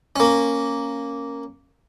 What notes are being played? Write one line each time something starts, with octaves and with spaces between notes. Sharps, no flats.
A#3 C#4